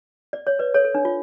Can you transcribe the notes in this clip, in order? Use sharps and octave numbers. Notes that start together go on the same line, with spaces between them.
D5
C#5
B4 D5
A4 C#5
A4
D4
F4